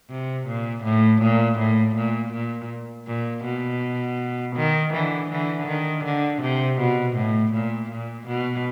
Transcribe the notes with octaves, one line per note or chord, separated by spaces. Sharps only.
C3
A#2
A2
A#2
A2
A#2
A#2
A#2
B2
D#3
D3 E3
D3 E3
D#3
D3
C3
B2
A2
A#2
A#2
B2